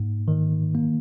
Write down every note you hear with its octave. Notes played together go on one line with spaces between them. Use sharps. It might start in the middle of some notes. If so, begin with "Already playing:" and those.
Already playing: G#2 A#3 D#4
D#3
A#3